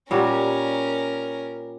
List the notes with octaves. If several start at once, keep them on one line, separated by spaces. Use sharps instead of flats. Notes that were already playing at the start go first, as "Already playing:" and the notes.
A#2 G3 C#4 F#4 A#4